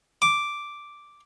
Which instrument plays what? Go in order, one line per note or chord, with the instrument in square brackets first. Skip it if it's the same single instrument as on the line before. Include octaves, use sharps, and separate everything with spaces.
[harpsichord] D6